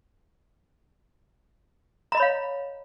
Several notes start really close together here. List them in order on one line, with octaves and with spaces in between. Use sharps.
A#5 D#5 B5 C#5 F5